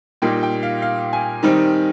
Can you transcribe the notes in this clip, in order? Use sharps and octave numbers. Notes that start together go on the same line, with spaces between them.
A#2 G3 A#3 D#4 G5
G5
F5
F5
G#5
D#3 G3 C4 D#4